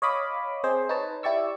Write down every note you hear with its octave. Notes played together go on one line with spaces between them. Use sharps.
C#5 D#5 F5 B5 D6 D#6
C4 G#4 C5 D#5
D#4 B4 C#5 A5
E4 G4 D5 C#6 E6